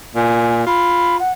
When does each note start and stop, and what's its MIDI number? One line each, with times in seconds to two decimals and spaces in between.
0.15 0.66 46
0.15 0.62 80
0.67 1.18 65
0.67 1.16 83
1.19 1.32 78